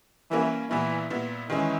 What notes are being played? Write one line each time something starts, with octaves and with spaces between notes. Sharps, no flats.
E3 G3 A#3 C#4
A#2 E3 G3 B3 E4
A#2 G3 B3 E4
D#3 E3 G#3 C#4